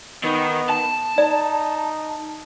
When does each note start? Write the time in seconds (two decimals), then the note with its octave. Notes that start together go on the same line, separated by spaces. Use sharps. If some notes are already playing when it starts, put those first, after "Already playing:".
0.24 D#3 B3
0.70 A5
1.18 D#4 D5